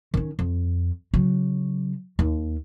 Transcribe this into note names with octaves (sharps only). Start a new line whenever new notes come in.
D#3 C#4
F2
C#3 F#3
D#2